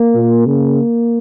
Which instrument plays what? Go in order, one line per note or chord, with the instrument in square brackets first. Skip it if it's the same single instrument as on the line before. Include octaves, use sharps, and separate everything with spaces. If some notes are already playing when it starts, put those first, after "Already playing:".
Already playing: [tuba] A#3
[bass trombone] A#2
[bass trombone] C#3 [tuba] A#3